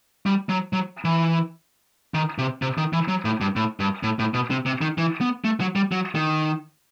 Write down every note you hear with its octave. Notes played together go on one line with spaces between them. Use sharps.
G3
F#3
F#3
E3
D#3
C3
C3
D#3
E3
F#3
A2
G2
A2
G2
A2
A2
B2
C3
C3
D#3
E3
B3
A3
F#3
G3
F#3
D#3